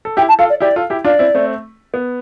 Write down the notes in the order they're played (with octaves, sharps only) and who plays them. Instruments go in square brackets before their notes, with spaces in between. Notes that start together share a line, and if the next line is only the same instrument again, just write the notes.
[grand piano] A4
[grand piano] E4 G4 [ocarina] G5
[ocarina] A5
[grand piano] F4 A4 [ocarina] F5
[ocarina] D5
[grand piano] E4 G4 [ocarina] D5
[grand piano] F4 A4
E4 G4
[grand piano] D4 F4 [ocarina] D5
[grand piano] C4 E4
A3 C4
B3